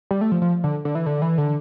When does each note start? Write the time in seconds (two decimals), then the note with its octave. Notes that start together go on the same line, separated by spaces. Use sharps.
0.11 G3
0.21 A3
0.32 F3
0.42 F3
0.64 D3
0.85 D3
0.95 E3
1.06 D3
1.22 E3
1.38 D3